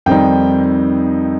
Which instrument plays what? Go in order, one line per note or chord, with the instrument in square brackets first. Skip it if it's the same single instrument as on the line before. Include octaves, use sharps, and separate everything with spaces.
[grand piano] F2 D#3 G3 C4 D#4 G5